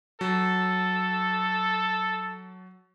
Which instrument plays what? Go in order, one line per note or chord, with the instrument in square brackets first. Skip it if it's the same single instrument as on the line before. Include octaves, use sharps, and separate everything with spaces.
[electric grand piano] F#3 [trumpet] A4